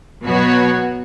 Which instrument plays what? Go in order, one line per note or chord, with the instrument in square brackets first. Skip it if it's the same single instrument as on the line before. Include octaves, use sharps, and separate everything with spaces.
[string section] B2 F#3 B3 F#4 C#5